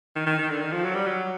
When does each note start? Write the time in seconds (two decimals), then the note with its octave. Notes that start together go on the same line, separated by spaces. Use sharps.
0.16 D#3
0.26 D#3
0.39 D#3
0.50 D3
0.61 D#3
0.72 F3
0.84 F#3
0.95 G3
1.06 F#3